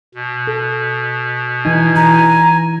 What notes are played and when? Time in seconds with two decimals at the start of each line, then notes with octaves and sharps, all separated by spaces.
0.14 B2
0.47 A4
1.65 E3 D#4 G#5
1.96 E3 A#5